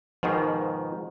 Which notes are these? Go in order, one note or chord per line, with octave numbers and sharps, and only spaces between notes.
G#2 B2 D#3 F3